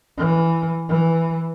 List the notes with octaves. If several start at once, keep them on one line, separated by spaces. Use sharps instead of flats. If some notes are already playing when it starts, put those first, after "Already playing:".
E3
E3